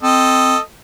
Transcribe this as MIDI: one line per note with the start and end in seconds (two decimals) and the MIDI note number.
0.03 0.55 60
0.03 0.59 69
0.03 0.59 75